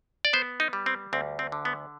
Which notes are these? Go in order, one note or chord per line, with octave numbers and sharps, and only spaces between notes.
D5
B3 C5
D#4
G3
C4
D2 C4
C4
D3
B3